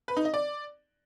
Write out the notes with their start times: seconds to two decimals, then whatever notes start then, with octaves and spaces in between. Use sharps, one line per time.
0.08 B4
0.17 D#4
0.25 D#5
0.34 D5